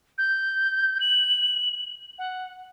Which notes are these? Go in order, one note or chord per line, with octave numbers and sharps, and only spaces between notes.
G6
F#7
F#5